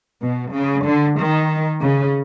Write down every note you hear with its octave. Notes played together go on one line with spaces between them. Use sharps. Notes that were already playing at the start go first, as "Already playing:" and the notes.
B2
C#3
D3
D#3
C#3